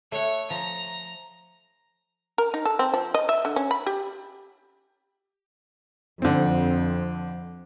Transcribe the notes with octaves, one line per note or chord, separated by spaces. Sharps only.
A3 C#5 F#5
F3 A#5
A#4
D#4
A4
C4
F3
D#5
E5
D3
C#4
B5
G4
F2 D3 C4